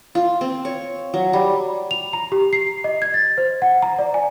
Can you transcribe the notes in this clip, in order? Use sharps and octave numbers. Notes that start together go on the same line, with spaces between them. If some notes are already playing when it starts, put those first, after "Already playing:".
F4
C4
C#5
F#3
G3
F7
A#5
G4
C7
D#5
G#6
A6
C5
F#5
A#5
D5
G#5